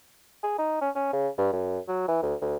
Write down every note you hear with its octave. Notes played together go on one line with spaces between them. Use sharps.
G#4
D#4
C#4
C#4
C#3
G2
F#2
F#3
E3
D2
D2